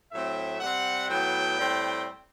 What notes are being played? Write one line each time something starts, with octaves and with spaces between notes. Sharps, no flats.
A2 F#3 A3 C4 E5
C3 G3 C4 F#5
A2 F#3 B3 G5
A2 G3 C4